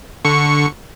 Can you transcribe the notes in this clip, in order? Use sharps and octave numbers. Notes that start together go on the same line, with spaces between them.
D3 C#6 C#7